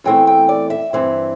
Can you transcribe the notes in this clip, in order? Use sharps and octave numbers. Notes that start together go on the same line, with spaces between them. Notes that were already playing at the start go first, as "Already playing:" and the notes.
E2 E3 A3 C4 E4 G5
G5
D5
E5
G2 E3 C4 E4